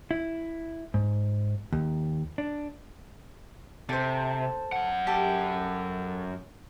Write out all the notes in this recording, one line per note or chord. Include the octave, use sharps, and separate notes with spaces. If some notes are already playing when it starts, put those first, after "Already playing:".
E4
G#2
D#2
D4
C3 A4 C5
F#2 F#5
G4 A4